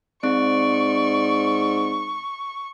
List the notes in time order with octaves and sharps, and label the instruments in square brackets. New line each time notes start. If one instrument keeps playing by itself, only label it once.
[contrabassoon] G#2 [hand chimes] C4 [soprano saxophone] D5 [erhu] C#6